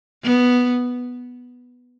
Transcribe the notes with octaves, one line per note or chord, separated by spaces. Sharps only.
B3